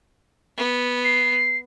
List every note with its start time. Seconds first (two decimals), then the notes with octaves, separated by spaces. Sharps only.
0.57 B3
1.04 C7